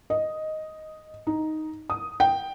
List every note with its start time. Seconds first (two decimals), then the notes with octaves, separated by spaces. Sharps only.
0.10 D#5
1.27 D#4
1.90 D#6
2.20 G5